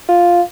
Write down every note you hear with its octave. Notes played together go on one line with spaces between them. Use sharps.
F4